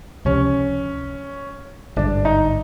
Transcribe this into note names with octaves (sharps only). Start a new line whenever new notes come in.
C#2 C3 F3 C#4
G#1 G2 D3 D4
D#4